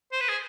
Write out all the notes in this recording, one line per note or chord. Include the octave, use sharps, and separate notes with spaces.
C5
B4
G#4